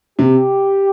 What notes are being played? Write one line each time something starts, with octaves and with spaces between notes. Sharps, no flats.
C3 G4